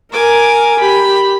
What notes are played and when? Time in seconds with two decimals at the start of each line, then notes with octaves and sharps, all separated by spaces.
0.12 A#4 G#5 D6
0.80 G4 B5